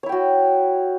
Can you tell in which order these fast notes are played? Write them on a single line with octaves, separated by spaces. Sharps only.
C#5 E4 G5 F#4